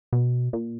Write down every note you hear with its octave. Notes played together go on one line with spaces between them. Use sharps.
B2
A#2